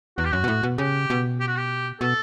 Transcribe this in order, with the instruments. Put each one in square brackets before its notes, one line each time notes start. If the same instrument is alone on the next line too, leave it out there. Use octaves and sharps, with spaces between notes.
[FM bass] E2 [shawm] F#4
[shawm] G4
[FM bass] F#2 [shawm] F#4
[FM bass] B2
A2
B2
[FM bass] C#3 [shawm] G4
[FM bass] B2
[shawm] G4
F#4
G4
[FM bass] B2 [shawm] A4